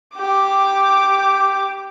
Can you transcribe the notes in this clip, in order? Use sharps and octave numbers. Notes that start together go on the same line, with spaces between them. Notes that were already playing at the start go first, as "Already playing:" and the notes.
G4 D6